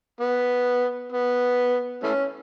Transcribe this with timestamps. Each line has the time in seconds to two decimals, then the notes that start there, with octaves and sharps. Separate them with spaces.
0.21 B3
1.12 B3
2.03 E3 A3 C#4